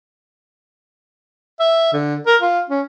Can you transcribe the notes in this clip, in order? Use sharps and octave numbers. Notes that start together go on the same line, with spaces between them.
E5
D3
A#4
F4
C#4